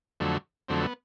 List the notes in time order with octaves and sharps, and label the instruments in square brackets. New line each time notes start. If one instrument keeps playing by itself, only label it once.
[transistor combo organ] F2 D3 F#3 A3
F2 D3 F#3 A3 C4
B3